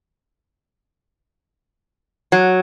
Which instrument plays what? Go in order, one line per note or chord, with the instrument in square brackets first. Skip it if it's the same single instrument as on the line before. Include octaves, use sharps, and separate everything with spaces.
[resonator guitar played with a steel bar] F#3